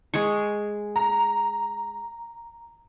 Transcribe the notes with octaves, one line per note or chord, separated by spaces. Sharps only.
G#3 G#4 C#6
A#5